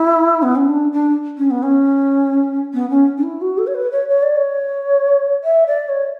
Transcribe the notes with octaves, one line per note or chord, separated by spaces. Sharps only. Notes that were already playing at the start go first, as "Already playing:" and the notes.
Already playing: E4
B3
C#4
D4
D4
C#4
B3
C#4
B3
C#4
D4
E4
F#4
A4
C#5
B4
C#5
C#5
D5
C#5
E5
D5
C#5